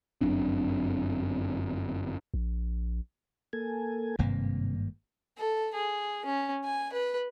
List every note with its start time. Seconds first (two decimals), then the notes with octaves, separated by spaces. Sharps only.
0.21 G1 F#2 C4 D4
2.34 A#1
3.53 A#3 A4 G#5
4.19 G#1 G2 C3 A#3
5.37 A4
5.74 G#4
6.25 C#4
6.64 G#5
6.92 B4